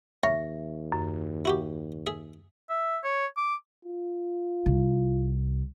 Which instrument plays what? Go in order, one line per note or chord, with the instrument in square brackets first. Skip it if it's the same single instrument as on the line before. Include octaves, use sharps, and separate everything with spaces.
[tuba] D#2 [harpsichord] C#5 F5 [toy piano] E5
[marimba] F#2
[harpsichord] E4 F#4 G4
G#4 E5
[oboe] E5
C#5
D6
[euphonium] F4
[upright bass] C2